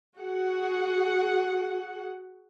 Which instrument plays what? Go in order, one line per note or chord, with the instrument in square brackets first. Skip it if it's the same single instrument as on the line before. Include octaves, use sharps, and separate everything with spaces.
[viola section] F#4 G#4 F#5